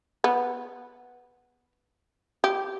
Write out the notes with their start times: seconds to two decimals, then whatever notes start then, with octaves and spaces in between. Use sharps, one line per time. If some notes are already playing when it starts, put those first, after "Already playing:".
0.24 B3
2.44 G4